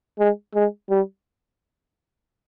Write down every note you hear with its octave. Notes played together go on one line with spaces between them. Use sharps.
G#3
G#3
G3